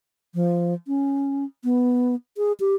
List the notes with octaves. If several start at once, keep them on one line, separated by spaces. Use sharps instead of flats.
F3
C#4
B3
G#4
G4